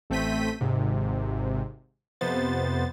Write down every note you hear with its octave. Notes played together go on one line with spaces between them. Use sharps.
A1 A3 C4 G6 B6 D#7
G#1 G#2 C3
F2 C3 B3 C5 A6